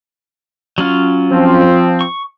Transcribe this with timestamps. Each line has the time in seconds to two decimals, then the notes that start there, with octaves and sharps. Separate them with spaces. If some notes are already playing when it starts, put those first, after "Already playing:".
0.78 F#3 C#4 F4
1.31 F3 C4
2.01 C#6